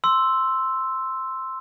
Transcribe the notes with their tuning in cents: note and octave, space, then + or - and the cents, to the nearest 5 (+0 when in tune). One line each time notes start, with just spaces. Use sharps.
C6 +0 E6 +0